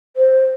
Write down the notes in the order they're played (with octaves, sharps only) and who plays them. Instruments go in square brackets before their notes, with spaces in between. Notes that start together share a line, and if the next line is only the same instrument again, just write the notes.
[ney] C5